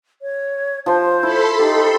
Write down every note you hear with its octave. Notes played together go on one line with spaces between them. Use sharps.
C#5
F3 C5 C6
E4 A4 B5 C6
D#4 G4